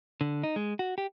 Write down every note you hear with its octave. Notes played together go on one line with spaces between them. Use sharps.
D3
D#4
G#3
F#4
G4